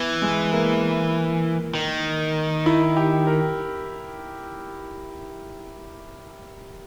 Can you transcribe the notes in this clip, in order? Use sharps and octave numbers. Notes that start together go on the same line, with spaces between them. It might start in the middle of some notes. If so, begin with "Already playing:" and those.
Already playing: E3 B3
G#3
A#3
D#3
E4
G4
A#4